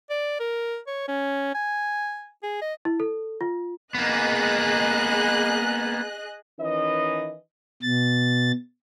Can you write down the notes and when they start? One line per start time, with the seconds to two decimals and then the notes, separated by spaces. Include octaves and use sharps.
0.10 D5
0.40 A#4
0.87 C#5
1.08 C#4
1.55 G#5
2.43 G#4
2.61 D#5
2.85 E4
3.00 A4
3.41 F4
3.95 A#3 B3 G#4 D#5 F#6
6.59 D#3 E3 C#4 B4 D#5
7.82 B2 A6